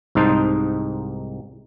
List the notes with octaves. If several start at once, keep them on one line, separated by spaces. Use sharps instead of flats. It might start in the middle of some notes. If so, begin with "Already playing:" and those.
C2 G#2 D#4 C5 A5